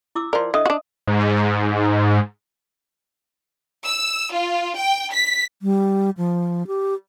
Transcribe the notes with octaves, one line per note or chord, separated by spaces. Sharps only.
E4 D6 E6
F3 A#4 D5 C6
D3 D#5 E5 D#6
D4 F#4
G#2
E6
F4
G5
B6
G3
F3
G4